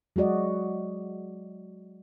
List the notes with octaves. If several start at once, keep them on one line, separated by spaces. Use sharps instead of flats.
F#3 G#3 F#4 D5 D#5